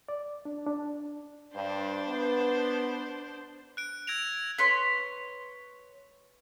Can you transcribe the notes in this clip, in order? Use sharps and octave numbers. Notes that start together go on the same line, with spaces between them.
D5
D4
D4
G2 D4 C5
B3
F#6 D7
E6 G#6 A#6 D7 F7
B4 C#5 C6